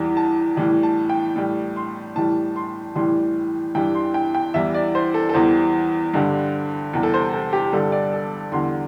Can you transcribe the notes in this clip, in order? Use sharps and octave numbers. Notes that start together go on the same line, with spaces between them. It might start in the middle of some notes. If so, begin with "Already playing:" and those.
Already playing: E2 E3 G3
A5
A2 E3 G3
A5
G5
A2 G3
C6
A2 E3 G3 A5
C6
A2 E3 G3 C6
G2 E3 G3 G5
C6
G5
G5
E2 E3 G3 E5
D5
C5
A4
A4
E2 E3 G3 C5
G2 D3 G3
E2 C3 G3
A4
C5
A4
G4
G2 D3 G3 A4
D5
A4
E2 D3 G3 C6